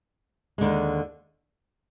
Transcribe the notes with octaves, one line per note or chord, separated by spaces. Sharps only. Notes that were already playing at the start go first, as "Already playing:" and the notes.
D#2 D3 G#3